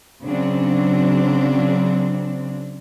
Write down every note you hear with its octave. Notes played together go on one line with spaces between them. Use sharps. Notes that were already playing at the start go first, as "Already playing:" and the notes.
C#3 F#3 C4 D4